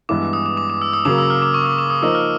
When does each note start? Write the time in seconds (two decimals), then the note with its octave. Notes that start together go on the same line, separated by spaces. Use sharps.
0.09 G2 E3 G#3 B3 E4 D6
0.33 D#6
0.46 D6
0.57 D6
0.70 D6
0.82 E6
0.93 D#6
1.05 C#3 F#3 A#3 D6
1.18 E6
1.30 F6
1.42 D6
1.54 C#6
1.66 D6
1.78 D6
1.90 D#6
2.02 F3 A#3 D#4 E6
2.15 F6